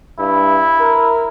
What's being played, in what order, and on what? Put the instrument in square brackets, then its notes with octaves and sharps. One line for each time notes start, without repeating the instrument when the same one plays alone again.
[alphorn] G2 [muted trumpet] E4
[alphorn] A#4